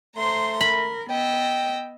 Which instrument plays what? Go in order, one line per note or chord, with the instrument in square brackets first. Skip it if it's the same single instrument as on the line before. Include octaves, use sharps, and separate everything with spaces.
[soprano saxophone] A3 [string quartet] C5 A#5 C6
[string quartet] A#4 [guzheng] B5
[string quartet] B3 D#5 E6 [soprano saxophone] G5